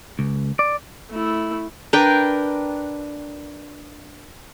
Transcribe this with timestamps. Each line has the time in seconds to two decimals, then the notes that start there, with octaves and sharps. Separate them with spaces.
0.19 C#2
0.59 D5
1.10 A3 E4
1.93 D4 A#4 B4 G5